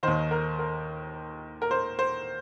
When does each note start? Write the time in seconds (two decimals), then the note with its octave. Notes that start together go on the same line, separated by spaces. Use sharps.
0.03 D#3 C5
0.07 D#2
0.31 A#4
0.59 A#4
1.62 A#4
1.71 C5
1.99 C5